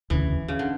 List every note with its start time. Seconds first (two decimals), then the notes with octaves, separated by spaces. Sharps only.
0.10 E1 D2 C#3 E3
0.48 C#3
0.59 D3